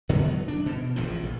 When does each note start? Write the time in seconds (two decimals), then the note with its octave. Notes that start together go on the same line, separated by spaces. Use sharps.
0.09 F2 D3 G#3 B3
0.26 F#3
0.48 D4
0.66 B2
0.96 E1 A1 A2 F3
1.23 A#1